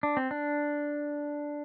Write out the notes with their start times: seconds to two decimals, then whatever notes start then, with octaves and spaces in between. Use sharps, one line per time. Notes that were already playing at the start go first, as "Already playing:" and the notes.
0.03 D4
0.17 C4
0.31 D4